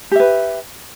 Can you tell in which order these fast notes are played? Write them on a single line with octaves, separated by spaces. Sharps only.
G4 E5 B4